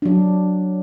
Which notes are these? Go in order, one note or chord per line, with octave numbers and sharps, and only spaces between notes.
F#3 D4